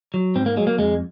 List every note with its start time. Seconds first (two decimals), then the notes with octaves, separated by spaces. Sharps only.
0.14 F#3
0.35 G#2 C4
0.46 A#3
0.57 F#3 G#3
0.67 A#3
0.79 F2 G#3